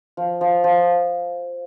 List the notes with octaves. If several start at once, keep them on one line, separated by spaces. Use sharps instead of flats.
F3
F3
F3